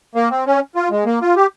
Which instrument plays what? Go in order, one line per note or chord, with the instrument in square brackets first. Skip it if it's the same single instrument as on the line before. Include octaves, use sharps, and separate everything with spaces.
[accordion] A#3
C4
C#4
F4
G#3
A#3
F4
G4